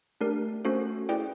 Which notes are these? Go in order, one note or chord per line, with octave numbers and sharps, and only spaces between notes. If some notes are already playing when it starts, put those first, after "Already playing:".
A3 D4 G4 A#4 D5
A3 C#4 F#4 A4 C5
E4 G#4 B4 D5 G5